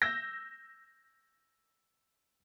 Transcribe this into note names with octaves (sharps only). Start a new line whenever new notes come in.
E6 G6 A#6